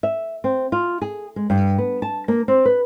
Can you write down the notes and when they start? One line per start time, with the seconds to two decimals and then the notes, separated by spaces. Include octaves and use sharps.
0.03 E5
0.44 C4
0.72 F4
1.02 G#4
1.36 G#3
1.50 G2
1.78 B3
2.02 A5
2.28 A#3
2.48 C4
2.65 B4